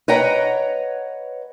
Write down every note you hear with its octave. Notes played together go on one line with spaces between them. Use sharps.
B4 C#5 D#5 F#5 G5 A#5